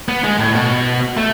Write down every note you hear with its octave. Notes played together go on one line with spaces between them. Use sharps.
B3
G#3
A2
B2
A3